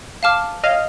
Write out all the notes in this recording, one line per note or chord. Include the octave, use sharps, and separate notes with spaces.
F5 A5 D6 F6
C#5 D#5 F5